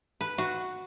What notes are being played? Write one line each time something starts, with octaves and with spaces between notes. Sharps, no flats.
B4
F#4